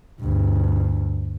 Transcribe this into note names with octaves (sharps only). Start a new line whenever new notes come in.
D2 G2